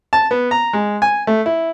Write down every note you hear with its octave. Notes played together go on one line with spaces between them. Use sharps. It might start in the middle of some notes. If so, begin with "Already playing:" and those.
A5
B3
A#5
G#3
G#5
A3
E4